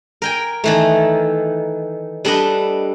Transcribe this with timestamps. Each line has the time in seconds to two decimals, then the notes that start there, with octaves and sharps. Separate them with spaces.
0.22 A#4 G5 G#5
0.64 D#3 E3 A3
2.25 G3 D4 A4 B4 D#5